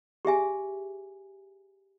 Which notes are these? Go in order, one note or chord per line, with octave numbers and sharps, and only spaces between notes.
G4 G#4 E5 G#5